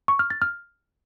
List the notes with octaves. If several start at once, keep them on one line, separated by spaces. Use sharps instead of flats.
C#6
F6
A6
F6